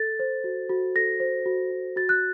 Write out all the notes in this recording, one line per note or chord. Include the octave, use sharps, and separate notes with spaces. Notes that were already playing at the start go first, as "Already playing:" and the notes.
Already playing: A4 A6
C5
F#4
F#4
A4 A#6
C5
F#4
F#4
F#4 A6
F#6